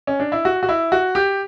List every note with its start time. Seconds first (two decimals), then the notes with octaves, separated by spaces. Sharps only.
0.07 C#4
0.20 D4
0.32 E4
0.45 F#4
0.63 F#4
0.69 E4
0.92 F#4
1.15 G4